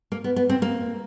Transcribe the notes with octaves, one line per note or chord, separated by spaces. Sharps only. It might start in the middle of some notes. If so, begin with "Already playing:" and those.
A#3
B3
B3
C4
A#3